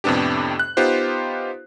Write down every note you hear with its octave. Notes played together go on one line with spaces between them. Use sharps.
F2 A2 C3 B3 D4 G4
F#6
B3 D#4 F4 G4 C5